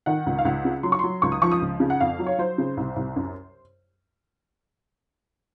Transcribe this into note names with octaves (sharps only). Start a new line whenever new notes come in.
D#3 F#5
C#2
F5
C#2 F#5
C#3
F#3 C6
C#6
F#3 C6
C#2 C#6
D#6
F3 C#6
D#6
C#2
C#3
F#5
F2 F5
F#3
C#5
F#3 C5
C#3
C2
C2
F#2